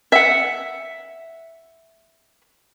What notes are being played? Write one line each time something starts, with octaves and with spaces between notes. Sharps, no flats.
E5 F#5